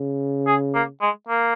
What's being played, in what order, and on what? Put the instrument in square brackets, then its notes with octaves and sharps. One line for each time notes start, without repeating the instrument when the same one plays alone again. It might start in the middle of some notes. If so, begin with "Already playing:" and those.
Already playing: [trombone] C#3
[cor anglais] G#4
A#3
G#3
A#3